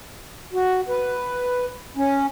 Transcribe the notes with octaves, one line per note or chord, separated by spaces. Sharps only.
F#4
B4
C#4